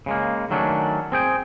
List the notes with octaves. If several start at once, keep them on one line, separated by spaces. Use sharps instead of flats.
C#3 G#3 A#3
D#3 F#3 A3 C#4 D4
C4 G#4 G5